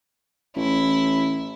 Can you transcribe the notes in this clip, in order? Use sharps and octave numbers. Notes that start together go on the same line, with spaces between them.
A1 E4